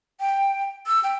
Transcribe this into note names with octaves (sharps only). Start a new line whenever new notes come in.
G5
E6
G5